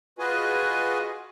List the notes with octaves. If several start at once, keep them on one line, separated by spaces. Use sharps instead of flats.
F4 F#4 G#4 B4 D#5 G#5